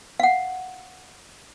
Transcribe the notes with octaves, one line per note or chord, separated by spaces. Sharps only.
F5 F#5